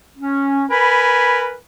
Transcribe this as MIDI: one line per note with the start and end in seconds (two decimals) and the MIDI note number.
0.18 0.65 61
0.71 1.55 70
0.71 1.55 71
0.71 1.55 80
0.71 1.43 83